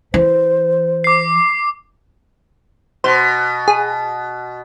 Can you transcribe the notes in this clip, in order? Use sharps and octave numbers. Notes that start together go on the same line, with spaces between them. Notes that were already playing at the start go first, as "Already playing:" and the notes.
E3 C5
D6 C7
B2 C5
G#4